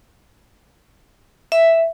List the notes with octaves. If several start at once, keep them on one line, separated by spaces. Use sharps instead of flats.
E5